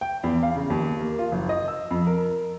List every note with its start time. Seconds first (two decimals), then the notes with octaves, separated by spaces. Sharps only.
0.01 G5
0.24 E2
0.43 F5
0.56 C#3
0.70 D#2
1.00 A#3
1.19 F4
1.32 F#1
1.49 D#5
1.68 E6
1.91 F2
2.07 A#4